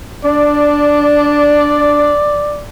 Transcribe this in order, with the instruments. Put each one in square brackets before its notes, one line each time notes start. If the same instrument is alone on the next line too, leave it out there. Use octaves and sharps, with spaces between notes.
[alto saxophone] D4 [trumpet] D5